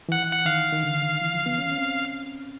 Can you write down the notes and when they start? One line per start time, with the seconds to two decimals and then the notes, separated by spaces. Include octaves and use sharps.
0.09 E3 F#5
0.33 F#5
0.45 D#3 F5
0.72 D#3
0.83 D3
1.03 D#3
1.22 E3
1.34 F3
1.46 B3
1.58 C#4
1.71 C#4
1.78 C4